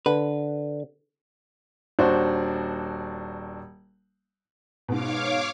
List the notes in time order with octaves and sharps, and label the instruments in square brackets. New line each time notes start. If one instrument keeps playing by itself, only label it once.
[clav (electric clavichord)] D3 [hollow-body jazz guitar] B4
[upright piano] D#1 D4 F#4 C5
[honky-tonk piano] G#2 B2 [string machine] C#5 F5 D6